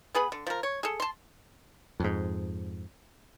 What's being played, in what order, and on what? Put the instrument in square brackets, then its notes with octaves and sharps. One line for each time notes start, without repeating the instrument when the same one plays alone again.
[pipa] B3 G#4 B4 B5
D3
F3 A#4
C#5
G#4 A4
A5 C6
[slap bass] F2 G#2